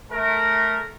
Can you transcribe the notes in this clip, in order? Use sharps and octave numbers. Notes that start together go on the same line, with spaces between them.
A3 A#4